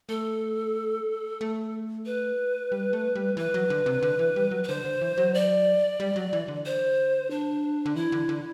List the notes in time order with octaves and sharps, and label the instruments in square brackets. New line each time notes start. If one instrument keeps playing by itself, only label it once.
[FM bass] A3 [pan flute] A4
[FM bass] A3
[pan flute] B4
[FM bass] G3
A3
G3
[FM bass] E3 [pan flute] B4
[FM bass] F#3
D3
C3
D3
E3
G3
F#3
[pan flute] B4
[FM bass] D3 [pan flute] C5
[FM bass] D3
E3
F#3
[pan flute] D5
[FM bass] G3
F#3
E3
D3
[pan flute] C5
D4
[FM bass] D3
[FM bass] E3 [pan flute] E4
[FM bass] D3
D3